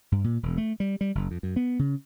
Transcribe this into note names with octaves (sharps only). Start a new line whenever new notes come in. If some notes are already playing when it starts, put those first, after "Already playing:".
G2
A#2
E1
A3
G3
G3
F#1
F2
F#2
B3
C#3